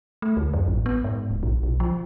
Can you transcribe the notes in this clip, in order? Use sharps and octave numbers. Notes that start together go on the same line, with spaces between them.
A3
D2
F#2
A1
B3
G#2
D1
A#1
B1
F3